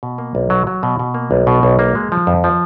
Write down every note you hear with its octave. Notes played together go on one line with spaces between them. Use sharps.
B2
A#3
B1
F#3
F#3
B2
B2
A#3
B1
B2
B1
A#3
G#3
F3
F2
F3